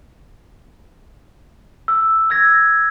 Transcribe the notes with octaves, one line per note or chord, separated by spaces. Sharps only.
E6
E6 G#6 A#6